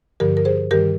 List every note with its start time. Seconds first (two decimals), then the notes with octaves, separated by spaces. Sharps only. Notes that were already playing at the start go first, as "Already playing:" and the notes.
0.20 G2 D3 F3 G4 A#4
0.37 A#4
0.45 G#4 C5
0.71 G2 D#3 G3 G4 A#4